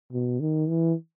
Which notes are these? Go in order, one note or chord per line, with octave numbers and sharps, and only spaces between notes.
B2
D#3
E3